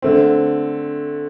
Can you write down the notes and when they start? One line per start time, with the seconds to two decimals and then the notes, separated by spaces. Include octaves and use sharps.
0.02 D3 A3 C4